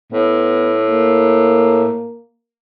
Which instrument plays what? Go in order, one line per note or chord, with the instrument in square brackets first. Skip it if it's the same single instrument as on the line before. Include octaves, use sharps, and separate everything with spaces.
[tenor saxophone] A2 [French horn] B3
[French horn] A#3